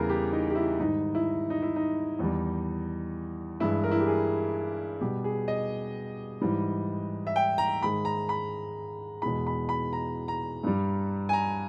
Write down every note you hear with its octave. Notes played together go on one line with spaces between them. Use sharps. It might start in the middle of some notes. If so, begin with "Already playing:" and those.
Already playing: E2 C#3 E3 G3 G#4 A#4
G4
D#4
G4
E4
G#2 D#3 G3 D#4
E4
D#4
E4
D#4
E2 D#3 G3
G2 E3 G#3 E4
A#4
E4
G4
G#4
B2 G3 G4
G#4
D#5
G#2 E3 G3
E5
G5
A#5
G#2 D#3 G#3 B5
A#5
B5
E2 B2 G#3 B5
B5
B5
A#5
A#5
G2 G3
G#5
A#5